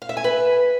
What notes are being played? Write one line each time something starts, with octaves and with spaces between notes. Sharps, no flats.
F5
E5
G#5
B4